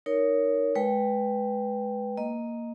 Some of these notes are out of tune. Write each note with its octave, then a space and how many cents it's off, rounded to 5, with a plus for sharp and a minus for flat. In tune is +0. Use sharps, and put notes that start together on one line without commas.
D#4 +0 A#4 +0 C#5 +15
G#3 +30 B4 +0 G5 +0
A#3 +0 D#5 +0